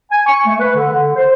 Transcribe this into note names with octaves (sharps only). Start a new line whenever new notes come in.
G#5
C#6
A3
B4
D3
D3
C5